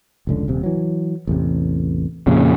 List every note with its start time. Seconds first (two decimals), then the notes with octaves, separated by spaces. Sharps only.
0.27 F1 C#2 D3
0.48 D#1 C3
0.63 E3 F#3
1.27 A1 E2 C3
2.27 F2 A#2 C#3